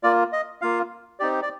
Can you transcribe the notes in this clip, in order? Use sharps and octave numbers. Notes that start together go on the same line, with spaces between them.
A#3 F4 D5
D#5
A#3 F4 F5
C4 D#4 G4 D5
D5